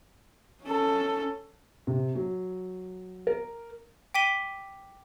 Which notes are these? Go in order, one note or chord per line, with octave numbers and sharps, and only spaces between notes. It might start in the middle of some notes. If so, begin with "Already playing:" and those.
C#4 A4
C3
F#3
A#4
G5 D6 B6 D#7 G7